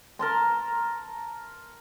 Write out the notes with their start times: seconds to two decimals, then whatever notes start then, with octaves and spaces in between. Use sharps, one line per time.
0.19 A#4 A5 C6